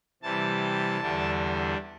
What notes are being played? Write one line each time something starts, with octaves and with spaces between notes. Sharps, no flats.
C3 E3 G3 A5
E2 D3 G3 D4